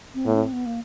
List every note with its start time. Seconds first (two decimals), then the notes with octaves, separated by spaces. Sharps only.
0.14 C4
0.26 A2 B3
0.35 C#4
0.40 C4
0.53 B3
0.66 A#3